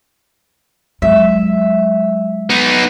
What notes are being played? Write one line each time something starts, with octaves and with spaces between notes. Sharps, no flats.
F#3 G#3 E5
B3 D#4